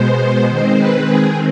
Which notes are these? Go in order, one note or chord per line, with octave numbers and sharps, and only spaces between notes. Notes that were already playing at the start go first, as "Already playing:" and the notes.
Already playing: B2 G#3 B3 C5
D#3 G#3 C4 C5
B4
G#4